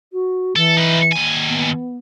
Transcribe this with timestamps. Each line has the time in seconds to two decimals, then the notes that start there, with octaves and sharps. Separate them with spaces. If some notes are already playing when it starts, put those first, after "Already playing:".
0.12 F#4
0.56 E3 A4
0.77 D#4 B4
1.12 D#2 G#5
1.48 B3